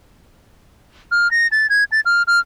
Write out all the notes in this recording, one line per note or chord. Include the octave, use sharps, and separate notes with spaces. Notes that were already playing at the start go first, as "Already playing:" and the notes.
F6
A#6
A6
G#6
A6
F6
F6